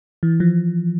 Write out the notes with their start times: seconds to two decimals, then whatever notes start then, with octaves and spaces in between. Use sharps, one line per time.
0.23 E3
0.40 F3